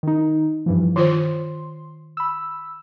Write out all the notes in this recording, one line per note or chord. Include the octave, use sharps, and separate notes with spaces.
D#3 D#4
G2 E3 F3
D#3 F4 C5 C6
B5 E6